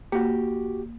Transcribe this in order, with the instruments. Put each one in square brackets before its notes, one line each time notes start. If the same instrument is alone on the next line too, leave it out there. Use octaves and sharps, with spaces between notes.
[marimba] A#3 [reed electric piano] F#4 G4